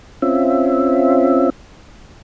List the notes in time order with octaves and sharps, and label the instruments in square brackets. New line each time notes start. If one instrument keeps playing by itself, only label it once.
[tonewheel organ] C4 C#4 F4 E5